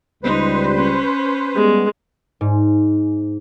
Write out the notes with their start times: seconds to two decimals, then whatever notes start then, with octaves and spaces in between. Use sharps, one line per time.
0.23 C#2 G3 D#4 B4 C5
0.77 C#4
1.56 G3 G#3 B3
2.41 G#2